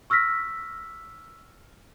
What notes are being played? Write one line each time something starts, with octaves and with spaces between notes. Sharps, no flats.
C#6 E6 F6 A#6 B6